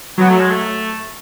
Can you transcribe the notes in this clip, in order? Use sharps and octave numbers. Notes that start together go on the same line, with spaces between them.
F#3 B3
A3
G#3
A3